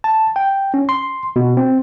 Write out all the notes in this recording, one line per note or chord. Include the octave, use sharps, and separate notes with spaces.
A5
G5
C#4
C6
B2
C4